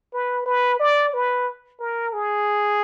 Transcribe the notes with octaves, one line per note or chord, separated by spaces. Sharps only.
B4
B4
D5
B4
A#4
G#4